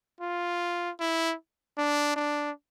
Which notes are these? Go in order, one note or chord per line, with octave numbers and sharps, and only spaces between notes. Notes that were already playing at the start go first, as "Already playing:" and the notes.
F4
E4
D4
D4